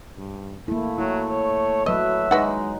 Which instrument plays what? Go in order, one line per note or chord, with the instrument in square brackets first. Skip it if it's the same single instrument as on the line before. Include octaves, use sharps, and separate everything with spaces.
[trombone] G2
[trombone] A3 [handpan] A#3 E4
[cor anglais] F#3 [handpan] E4
[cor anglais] C#5
[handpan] F#3 B4 [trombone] A3 [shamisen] D#5 [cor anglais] E5
[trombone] G#3 [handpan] D#4 [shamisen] F#4 B4 F#5